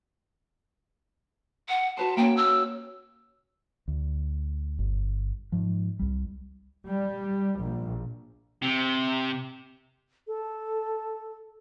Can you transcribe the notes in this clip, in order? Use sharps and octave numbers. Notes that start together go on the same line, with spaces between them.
F#5
F#4 B4 A5 C6
A#3 C#4 G5
E6
D2
G1
G#2 F3
C2 G3
G3
A#1
C3
A4